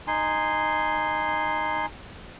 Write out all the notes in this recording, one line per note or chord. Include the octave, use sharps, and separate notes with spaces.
D#4 G#5 C6